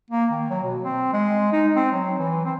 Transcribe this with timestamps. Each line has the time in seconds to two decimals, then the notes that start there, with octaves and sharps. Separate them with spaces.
0.10 A#3
0.31 D#3
0.50 F#3
0.63 B2
0.84 C4
1.13 G#3
1.53 D#4
1.76 C4
1.92 F#3
2.18 E3
2.45 C4